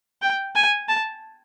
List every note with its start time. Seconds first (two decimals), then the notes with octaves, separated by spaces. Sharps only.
0.22 G5
0.56 G#5
0.89 A5